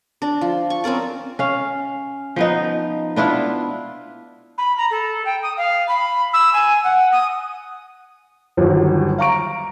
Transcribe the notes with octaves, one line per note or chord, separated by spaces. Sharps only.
D4
F3
C#6
C4 C#4 A#4 D5
C#4 F5
F3 B3 D#4
B3 D4 E4 F4
B5
A#5
A4
G5
D#6
F5
B5
E6
G#5
F#5
D#6
G1 D#2 F3 F#3
F5 A#5 C#6 D7